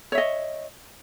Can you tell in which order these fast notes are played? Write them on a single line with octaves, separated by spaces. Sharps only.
C#5 E5 D#5